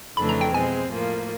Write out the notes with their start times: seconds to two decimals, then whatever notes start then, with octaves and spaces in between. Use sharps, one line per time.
0.17 F2 C#3 E3 A3 D4 B5
0.29 A#5
0.41 G5
0.54 B2 G#3 C4 G#5
0.91 A2 F3 A#3